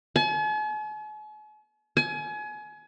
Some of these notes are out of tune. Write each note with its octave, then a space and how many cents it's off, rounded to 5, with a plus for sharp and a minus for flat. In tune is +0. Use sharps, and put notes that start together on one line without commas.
G#5 +45
G#5 +30